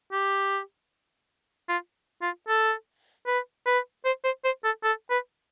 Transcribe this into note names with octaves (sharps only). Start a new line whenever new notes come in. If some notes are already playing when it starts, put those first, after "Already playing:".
G4
F4
F4
A4
B4
B4
C5
C5
C5
A4
A4
B4